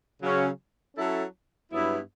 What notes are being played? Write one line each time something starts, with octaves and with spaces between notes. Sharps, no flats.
C#3 F#3 C#4
F#3 C#4 E4 A4
G2 F#3 B3 E4